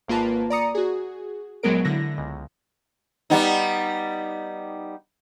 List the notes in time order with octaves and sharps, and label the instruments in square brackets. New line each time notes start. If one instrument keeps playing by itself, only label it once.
[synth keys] G#1 A#3 F4 B4 A5
D5 A#5 D#6 C#7
F#4 G#4
A#1 F#3 G#3 B3 A#4 D7
D3 E4 A#6
C#2
[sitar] G3 B3 D#4